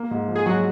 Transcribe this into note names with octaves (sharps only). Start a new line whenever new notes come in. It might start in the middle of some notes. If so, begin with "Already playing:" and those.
Already playing: A#3
G#2
F3
G#4
G#2 F#3 F#4